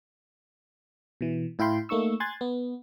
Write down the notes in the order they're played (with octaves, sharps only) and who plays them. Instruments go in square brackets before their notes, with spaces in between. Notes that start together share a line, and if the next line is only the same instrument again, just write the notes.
[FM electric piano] B2 E3
A2 E4 F5 G5 B5 C6
A3 A#3 D#4 C#6 E6
G#5 C6 F#6 G#6 A6
B3